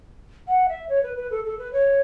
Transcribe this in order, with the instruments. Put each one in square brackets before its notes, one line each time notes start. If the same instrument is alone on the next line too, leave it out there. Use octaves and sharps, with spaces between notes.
[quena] F#5
E5
C#5
B4
B4
A4
A4
B4
C#5